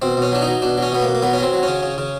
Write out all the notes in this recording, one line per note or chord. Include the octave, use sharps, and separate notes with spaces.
B2 C4
B2 C#4
F#3 D4
D#4
F#3
B2 D4
F#3 C#4
B2 B3
A#3
B2
A#3
F#3 B3
C#4
F#3 C4
F#3
C#3 C#4
C#3
C#3